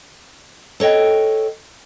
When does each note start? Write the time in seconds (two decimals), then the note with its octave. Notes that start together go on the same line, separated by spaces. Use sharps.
0.80 A4 C#5 D#5 G5